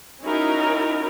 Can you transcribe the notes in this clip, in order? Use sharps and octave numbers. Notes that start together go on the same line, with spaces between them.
C#4 D#4 E4 F#4 A#4